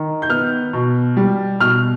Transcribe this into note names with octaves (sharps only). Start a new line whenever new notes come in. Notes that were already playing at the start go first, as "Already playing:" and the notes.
Already playing: D#3
G6
B3 F6
B2
G3
B2 F6